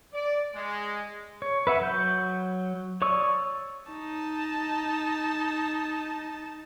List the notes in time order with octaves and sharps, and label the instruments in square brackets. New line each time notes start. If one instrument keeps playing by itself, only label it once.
[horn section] D5
G#3
[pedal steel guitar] C#5
B4 E5 F#5
F#3 G6
C#5 D5 C#6 D#6 E6
[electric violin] D#4 A5